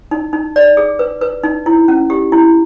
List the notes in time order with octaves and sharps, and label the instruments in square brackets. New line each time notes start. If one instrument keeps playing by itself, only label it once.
[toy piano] D#4
D#4
D5
G#4
B4
B4
D#4
E4
C#4
G4
E4